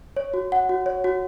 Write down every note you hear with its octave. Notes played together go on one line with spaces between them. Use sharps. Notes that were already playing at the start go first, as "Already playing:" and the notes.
C#5
F#4
F#5
F#4
C#5
F#4